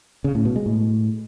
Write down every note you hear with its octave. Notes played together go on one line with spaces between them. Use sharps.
C#3
A2
B2
G#3
A2